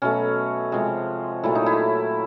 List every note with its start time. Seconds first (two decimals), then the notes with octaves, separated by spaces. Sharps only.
0.02 B2 F#3 A3 C#4
0.72 C3 F3 G#3
1.44 A#2 F#3 A3 E4
1.55 D#4
1.66 E4